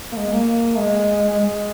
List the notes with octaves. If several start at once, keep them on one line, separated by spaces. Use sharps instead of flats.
A#3
G#3
A#3
G#3
G#3